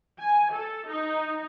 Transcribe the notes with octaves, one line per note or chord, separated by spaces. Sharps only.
G#5
A4
D#4